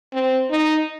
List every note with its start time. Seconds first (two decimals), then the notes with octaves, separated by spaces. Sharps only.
0.13 C4
0.50 D#4